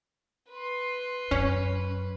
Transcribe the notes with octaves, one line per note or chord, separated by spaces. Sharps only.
B4 C6
F#2 C#4